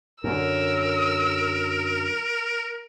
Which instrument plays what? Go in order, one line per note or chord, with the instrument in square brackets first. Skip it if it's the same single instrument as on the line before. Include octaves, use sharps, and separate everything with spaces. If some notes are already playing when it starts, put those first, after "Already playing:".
[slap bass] F#2 D3 [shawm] A#4 [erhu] E6